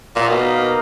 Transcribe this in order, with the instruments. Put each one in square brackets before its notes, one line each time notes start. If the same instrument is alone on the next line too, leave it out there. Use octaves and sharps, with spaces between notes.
[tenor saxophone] A#2
[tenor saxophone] B2 [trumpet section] A#3 D#4 A#4 F5